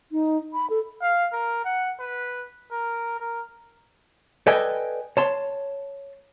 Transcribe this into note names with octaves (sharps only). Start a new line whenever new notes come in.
D#4
B5
A4
F5
A#4
F#5
B4
A#4
A#4
A4 B4 D5 D#5 G5 G#5
C#5 A5 C6